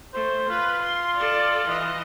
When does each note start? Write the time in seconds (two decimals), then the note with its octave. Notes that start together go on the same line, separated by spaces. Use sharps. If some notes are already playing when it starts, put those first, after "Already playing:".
0.14 A3 C5
0.49 F4 B4
0.82 C6
1.17 A4 D5
1.67 E3 D#5